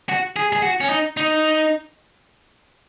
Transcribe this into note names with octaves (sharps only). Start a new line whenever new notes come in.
F#4
G#4
G#4
F#4
C#4
D#4
D#4